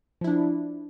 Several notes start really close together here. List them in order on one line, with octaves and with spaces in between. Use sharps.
F3 E4 D4